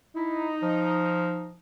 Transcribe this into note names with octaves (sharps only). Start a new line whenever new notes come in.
D#4 E4
F3